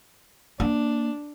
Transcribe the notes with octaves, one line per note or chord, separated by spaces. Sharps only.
A#3 D4